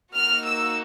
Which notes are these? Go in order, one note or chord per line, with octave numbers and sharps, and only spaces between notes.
A#3 D#4 F#4 F6
E6